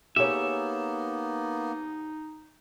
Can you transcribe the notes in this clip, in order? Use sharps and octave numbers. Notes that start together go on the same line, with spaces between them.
A#3 B3 D#4 G4 G#4 C#5 E5